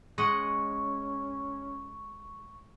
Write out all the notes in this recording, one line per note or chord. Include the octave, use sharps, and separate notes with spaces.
G#3 C#4 D#5 F#5 C#6